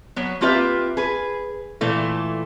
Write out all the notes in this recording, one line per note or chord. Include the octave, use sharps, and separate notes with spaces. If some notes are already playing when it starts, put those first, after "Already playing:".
F#3 B3
A#3 C4 F4 G4 B4 E5
G#4 B4
A#2 E3 A3